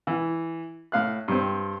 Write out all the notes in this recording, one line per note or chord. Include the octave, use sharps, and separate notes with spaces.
E3
A2 F5 F#6
G2 C4